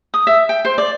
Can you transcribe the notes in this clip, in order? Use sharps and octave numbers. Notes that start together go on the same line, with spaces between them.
D#6
E5
G5
C5
D5